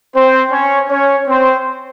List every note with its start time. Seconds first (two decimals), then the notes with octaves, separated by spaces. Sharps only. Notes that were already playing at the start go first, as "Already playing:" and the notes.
0.15 C4 C5
0.52 C#4 C#5
0.90 C#4 C#5
1.28 C4 C5